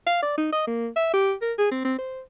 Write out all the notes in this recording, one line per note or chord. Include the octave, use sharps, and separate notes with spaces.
F5
D5
D#4
D#5
A#3
E5
G4
A#4
G#4
C4
C4
C5